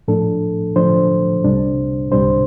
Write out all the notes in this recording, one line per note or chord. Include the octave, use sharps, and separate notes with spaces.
A2 F3 D4 A4
A2 F3 D4 C5
C2 C3 G3 D4
C2 C3 G3 D4 C5